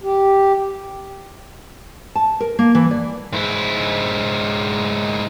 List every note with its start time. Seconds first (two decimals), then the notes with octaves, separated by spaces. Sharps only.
0.03 G4
2.15 A5
2.41 A#4
2.59 A#3
2.75 E3
2.91 D5
3.33 G#2 E4